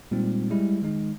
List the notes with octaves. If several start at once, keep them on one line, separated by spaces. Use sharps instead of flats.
A#2 G3 G#3 C4 D#4
G3 G#3 E4
D#3 G#3 D#4